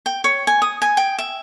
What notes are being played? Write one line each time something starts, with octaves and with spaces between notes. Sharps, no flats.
G5
C#5
G#5
D#6
G#5
G5
E5